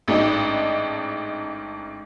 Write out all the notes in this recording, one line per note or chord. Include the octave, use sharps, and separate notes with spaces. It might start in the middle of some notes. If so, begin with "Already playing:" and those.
A1 G#2 D4 D#4